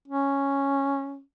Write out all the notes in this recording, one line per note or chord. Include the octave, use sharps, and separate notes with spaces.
C#4